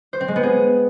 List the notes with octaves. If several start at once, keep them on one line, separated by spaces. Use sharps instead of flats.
C5
C4
G#3
B3
G#4